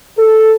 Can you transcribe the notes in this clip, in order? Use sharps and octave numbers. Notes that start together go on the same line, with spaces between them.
A4